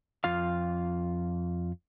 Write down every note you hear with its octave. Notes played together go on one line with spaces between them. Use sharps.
F2 F4 F5